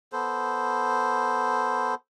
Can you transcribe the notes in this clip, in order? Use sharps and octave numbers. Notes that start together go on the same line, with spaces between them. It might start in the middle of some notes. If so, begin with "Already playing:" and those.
B3 A4 C5